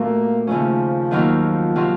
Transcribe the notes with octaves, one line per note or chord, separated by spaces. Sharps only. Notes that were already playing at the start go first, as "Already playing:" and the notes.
Already playing: A#2 A3 A#3 C4 F#4
D#2 C#3 F3 A3 C#4
D#2 D#3 F#3 C4 F4
C3 F#3 C4 F4